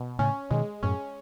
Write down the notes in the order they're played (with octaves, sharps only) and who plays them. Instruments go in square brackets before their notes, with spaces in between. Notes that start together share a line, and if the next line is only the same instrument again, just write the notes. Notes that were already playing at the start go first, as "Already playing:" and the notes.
Already playing: [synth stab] B2
[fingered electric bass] A2 C#3 [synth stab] C#4
[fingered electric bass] B2 D#3 [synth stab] G#3
[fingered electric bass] F#2 A2 [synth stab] C#4